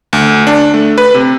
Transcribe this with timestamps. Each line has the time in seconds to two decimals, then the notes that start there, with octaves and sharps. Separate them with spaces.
0.13 D2
0.47 D4
0.74 A3
0.98 B4
1.15 C3